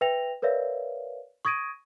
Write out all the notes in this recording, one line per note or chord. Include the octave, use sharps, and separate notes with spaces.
B4 E5 G5 A#6 F7
A#4 B4 C#5 D5 E5 F5
C#6 D#6 G#6 A#6 D7 D#7